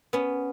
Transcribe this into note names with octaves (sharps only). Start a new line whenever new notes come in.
B3 C#4